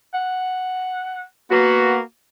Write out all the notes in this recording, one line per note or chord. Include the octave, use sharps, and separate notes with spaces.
F#5
A#3 B3 F#4